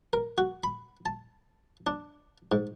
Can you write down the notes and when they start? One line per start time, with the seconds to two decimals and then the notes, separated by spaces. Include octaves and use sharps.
0.13 A#4
0.38 F#4
0.64 B5
1.06 A5
1.87 D4
2.52 G#2